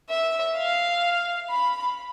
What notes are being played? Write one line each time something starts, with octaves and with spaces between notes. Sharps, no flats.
E5
F5
B5